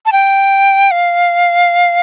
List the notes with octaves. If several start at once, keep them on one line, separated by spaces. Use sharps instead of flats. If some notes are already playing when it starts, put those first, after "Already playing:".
A5
G5
F5